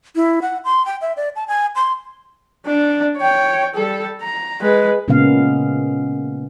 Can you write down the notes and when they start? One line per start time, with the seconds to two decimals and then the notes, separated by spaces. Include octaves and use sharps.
0.16 E4
0.42 F#5
0.64 C6
0.86 G5
1.01 E5
1.16 D5
1.35 A5
1.48 G#5
1.75 C6
2.66 D4
3.17 C#5 G5
3.75 G3 A4
4.22 A#5
4.62 G#3 B4
5.08 A#2 C#3 G#3 A#3 B3 F5